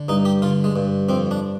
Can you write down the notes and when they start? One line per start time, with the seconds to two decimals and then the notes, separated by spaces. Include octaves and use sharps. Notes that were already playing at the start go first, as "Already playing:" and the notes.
Already playing: D3
0.08 G2 D#4
0.25 G4
0.42 D3 F4
0.64 G#3
0.76 G2
1.09 F2 C4
1.31 D4